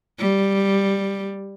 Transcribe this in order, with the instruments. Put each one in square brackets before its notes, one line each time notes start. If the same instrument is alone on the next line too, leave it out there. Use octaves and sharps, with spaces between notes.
[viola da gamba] G3